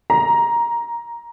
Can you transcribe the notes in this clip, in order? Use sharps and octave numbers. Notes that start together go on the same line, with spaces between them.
A#5